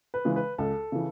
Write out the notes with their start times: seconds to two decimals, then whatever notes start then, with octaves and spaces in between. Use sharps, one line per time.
0.14 B4
0.25 C#3 E3 G#3
0.36 B4
0.58 C#2 A4
0.92 C#3 E3